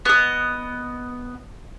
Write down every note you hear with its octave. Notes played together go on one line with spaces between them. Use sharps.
B3 D#5